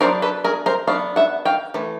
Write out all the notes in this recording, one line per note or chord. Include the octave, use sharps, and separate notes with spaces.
F#3 B3 D4 A#4 C5
A4 B4
G#4 A#4
A#4 C5
F#3 B3 D4 F5
E5 F#5
F5 G5
E3 A3